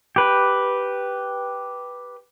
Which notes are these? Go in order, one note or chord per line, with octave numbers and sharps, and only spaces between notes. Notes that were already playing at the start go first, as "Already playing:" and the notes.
G4 B4